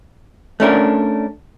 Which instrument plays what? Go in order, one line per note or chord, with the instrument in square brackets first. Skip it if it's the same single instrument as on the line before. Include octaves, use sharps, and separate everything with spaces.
[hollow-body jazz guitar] A3 C#4 D4 A#4